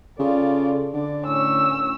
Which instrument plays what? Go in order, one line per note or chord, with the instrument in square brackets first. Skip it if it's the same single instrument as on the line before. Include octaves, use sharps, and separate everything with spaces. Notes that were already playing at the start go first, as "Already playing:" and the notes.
[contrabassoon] C#3 [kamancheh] F4 D5 [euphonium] A4
[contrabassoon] D3 [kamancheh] D5
[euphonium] A2 [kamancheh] C#4 E6
[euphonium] A2